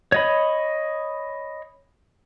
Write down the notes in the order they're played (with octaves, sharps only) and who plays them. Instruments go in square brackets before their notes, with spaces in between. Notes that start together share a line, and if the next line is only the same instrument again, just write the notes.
[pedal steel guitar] C#5 D#5 B5